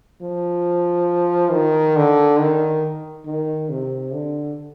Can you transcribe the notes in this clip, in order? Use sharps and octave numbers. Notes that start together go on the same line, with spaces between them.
F3
D#3
D3
D#3
D#3
C3
D3